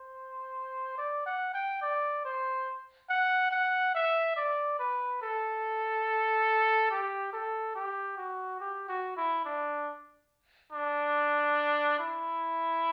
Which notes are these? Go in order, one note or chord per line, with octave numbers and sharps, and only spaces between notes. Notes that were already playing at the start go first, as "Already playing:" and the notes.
Already playing: C5
D5
F#5
G5
D5
C5
F#5
F#5
E5
D5
B4
A4
G4
A4
G4
F#4
G4
F#4
E4
D4
D4
E4